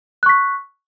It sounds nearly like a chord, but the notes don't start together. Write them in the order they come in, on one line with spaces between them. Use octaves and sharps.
F#6 C#6 B6